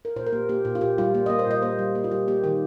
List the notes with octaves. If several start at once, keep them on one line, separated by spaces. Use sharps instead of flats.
A#4
A#2 C5
A#4
A#3 G4
A#3 G4
A#2
F4
A#2 G4
G3 F4
A#3
D#5
A#3
C5
A#2 D#5
A#3 C5
G3
A#3
F4
G3 G4
A#3 G4
D#3 G4